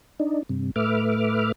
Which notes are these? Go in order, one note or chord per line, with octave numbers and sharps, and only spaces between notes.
D4 D#4
G2 C3
A2 A3 B4 E5 D6 F6